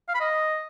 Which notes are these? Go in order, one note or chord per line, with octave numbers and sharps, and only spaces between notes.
F5
B5
D#5